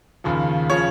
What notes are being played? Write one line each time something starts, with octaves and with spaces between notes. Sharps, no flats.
D#2 C#3 F3
C#3 F3 C#5